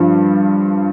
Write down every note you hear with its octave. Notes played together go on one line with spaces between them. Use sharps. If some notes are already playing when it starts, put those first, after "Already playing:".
Already playing: G2 F3